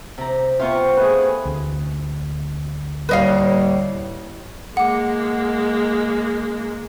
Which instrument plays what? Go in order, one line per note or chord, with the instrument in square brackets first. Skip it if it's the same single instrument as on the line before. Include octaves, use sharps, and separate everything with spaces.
[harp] C3 A#5
[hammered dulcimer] C3 [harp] B3 C5 F5 [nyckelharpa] F4 C#6
[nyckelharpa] A3 G#4 [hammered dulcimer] B4
[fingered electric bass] D2
[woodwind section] D#2 A2 G3 [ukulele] B4 D#5 F5
[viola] G#3 A#3 [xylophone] F#5 D6